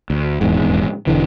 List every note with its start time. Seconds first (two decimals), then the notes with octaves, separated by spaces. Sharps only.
0.10 D2
0.41 D#1 E2 G#2
1.07 E1 D3 E3